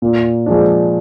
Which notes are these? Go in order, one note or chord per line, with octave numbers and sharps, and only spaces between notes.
A#2
F3 G#3 D4